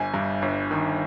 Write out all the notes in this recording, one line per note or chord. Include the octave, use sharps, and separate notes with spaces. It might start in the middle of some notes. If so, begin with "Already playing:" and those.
Already playing: G1 G#5
G2
G1
D#3